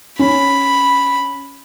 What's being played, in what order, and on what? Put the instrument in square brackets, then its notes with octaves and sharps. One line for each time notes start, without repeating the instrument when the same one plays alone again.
[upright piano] C#4 [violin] B5